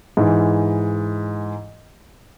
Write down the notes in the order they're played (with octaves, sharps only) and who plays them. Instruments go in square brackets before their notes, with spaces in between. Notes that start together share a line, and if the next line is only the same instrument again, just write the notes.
[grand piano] G#2 E3